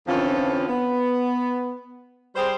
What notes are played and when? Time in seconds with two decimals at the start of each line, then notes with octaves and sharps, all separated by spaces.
0.07 F2 D3 E3 F3 C#4 F4
0.68 B3
2.35 G3 G4 G#4 C5